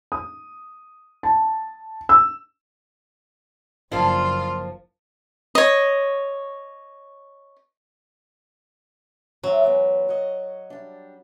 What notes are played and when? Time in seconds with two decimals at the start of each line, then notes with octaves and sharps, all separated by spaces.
0.12 D#6
1.23 A5
2.09 E6
3.92 F#1 F3 A#3 D4 F4
5.55 C#5 D#5
9.43 F#3 C5 E5
9.63 E3 G#3 B3
10.08 F#4 C#5 D#5
10.70 G3 D4